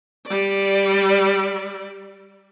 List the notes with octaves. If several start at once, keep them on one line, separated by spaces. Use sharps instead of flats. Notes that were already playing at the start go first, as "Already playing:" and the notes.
G3 D5